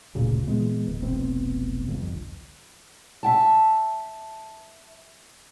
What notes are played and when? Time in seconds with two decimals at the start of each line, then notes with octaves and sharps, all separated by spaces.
0.15 F#1 D2 A#2 C#3
0.47 A#2 E3 G#3 B3
0.86 D1
1.02 F1 B1 B3 C4
1.88 G1 C2 F2
3.23 E5 G5 A5